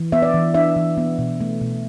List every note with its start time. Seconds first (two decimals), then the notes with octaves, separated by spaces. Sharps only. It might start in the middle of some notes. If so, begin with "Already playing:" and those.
Already playing: E3
0.12 B3 E5
0.22 D5
0.34 E3
0.54 D4 E5
0.76 E3
0.98 B3
1.18 B2
1.40 A3
1.61 B2